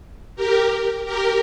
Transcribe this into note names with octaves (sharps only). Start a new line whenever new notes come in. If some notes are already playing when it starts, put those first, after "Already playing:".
G4 A#4
G4 A#4